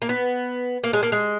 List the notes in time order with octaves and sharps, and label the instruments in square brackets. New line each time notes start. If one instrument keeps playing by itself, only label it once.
[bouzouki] A#3
B3
A#3
G#3
A#3
G#3